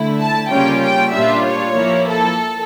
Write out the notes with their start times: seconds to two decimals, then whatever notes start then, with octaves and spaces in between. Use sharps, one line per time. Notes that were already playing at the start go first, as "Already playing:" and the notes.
Already playing: D3 A3 E4
0.19 A5
0.50 C#3 G3 A#3 C#4 F4 G5
0.82 G5
1.13 A#2 G3 D4 F4 E5
1.44 C#5
1.75 F3 A#3 E4
2.06 A4